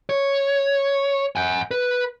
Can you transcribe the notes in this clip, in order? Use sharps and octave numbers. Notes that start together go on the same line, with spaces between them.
C#5
F#5 G#5
B4